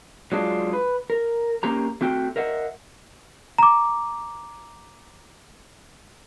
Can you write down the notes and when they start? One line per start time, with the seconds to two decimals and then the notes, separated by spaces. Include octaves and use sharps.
0.32 F#3 G#3 D4 E4 F4
0.73 B4
1.10 A#4
1.63 A#3 C#4 G4 A#5
2.01 A3 C4 F#4 G5
2.36 A#4 D#5 E5 F#5
3.58 A#5 D6